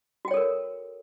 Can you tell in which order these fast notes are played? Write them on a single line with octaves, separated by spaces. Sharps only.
F#4 G5 C#5 A4 A#4